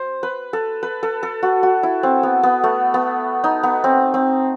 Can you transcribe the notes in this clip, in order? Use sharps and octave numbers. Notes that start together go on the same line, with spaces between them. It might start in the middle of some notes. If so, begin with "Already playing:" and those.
Already playing: C5
B4
A4
B4
A4
A4
F#4
F#4
E4
C4
B3
B3
A3
B3
D#4
B3
C4
C4